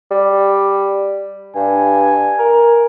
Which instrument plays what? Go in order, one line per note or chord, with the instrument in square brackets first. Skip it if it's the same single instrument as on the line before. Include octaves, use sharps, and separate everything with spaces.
[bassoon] G3
[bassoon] G2 [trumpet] G#5
[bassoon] A#4